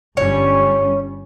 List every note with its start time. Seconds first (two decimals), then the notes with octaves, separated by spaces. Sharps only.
0.17 G1 G3 C#4 C#5